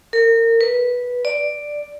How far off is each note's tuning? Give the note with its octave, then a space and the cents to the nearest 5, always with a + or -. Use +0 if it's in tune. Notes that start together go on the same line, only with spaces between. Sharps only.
A#4 -30
B4 -10
D5 +5